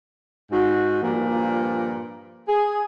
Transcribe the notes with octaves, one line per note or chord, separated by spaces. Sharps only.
G#2 F#4
G2 A#2 F3 A#3
G#4